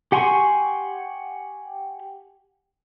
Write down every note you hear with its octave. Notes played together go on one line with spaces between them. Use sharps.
G4 F#5 G#5 C6 C#6